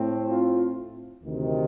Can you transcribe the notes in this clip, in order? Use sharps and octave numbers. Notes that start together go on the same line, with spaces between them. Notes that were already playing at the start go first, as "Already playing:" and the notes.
Already playing: A2 A3 C4
F4
D2 C3 D#3